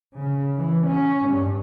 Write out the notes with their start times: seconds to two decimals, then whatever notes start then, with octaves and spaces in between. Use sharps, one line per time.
0.20 C#3
0.59 E3
0.89 C#4
1.29 G2